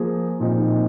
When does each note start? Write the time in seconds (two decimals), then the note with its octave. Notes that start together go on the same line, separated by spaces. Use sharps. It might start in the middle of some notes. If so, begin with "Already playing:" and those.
Already playing: F3 A#3 G#4
0.40 A#2 F3 C4 D#4